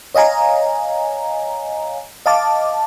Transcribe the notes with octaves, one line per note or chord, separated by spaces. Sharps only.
C#5 D#5 F5 G#5 A#5
D#5 F5 A5 D6